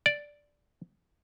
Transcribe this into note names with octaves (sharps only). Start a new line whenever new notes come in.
D5